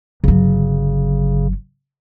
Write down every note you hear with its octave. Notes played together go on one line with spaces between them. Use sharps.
G1 C#3 F#3